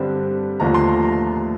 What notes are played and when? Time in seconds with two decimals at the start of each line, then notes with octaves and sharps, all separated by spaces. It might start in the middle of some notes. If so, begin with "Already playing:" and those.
Already playing: G2 D3 G3 C4
0.60 D#2 D3 F3 A3 A#5
0.74 C6
0.88 A#5
1.03 A#5